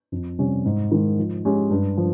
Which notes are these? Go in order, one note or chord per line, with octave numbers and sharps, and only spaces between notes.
F2
C3 G3 C#4
G#2
D#3 G#3
F3
G#3 C#4 G4
G2
F3